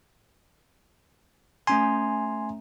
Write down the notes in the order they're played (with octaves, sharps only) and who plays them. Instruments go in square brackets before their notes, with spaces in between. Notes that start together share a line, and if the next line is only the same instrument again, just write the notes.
[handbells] A3 C#4 A#5 [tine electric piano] G#5 C6